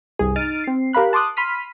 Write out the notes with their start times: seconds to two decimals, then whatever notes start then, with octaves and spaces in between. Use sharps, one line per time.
0.19 C2 G2 G#4
0.36 D#4 F6 A6 D7 D#7
0.64 C4 C7
0.93 G4 A#4 F5 B5 F#6
1.13 A5 C6 D6 D#6 F#6
1.37 B5 C6 F6 B6 D#7